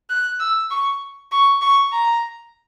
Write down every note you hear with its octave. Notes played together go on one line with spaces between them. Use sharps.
F#6
E6
C#6
C#6
C#6
A#5